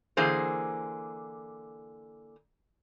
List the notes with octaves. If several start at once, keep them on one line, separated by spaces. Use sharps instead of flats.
D3 E3 A#3 G#4 C5